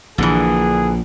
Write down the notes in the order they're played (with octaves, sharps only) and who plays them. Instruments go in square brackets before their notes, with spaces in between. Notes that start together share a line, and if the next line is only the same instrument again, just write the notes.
[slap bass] A#1 A#2 [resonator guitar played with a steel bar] D3 E3 [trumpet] G#4